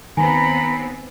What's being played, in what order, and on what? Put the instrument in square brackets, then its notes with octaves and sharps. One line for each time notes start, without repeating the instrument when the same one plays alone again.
[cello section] D#2 B3 C4 [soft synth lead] D#3 [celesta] G#5 [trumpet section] A#5 B5